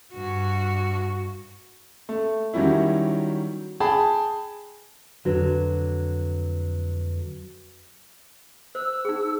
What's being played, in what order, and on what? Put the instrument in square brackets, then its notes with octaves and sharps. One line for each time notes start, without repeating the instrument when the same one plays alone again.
[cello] G2 F#4
[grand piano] A3
D#3 F#3 G3 C#4 E4
G#4 G5 A5 B5
[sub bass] F2 [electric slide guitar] D3 F#3 [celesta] F#4 B4
[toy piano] C5 [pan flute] E6
[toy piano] D#4 G#4